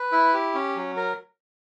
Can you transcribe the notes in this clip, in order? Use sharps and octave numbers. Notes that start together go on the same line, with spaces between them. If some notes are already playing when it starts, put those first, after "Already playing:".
Already playing: B4
E4
G4
C#4
F#3
A#4